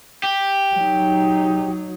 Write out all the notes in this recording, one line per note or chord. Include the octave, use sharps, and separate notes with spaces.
G4
F#3 D#4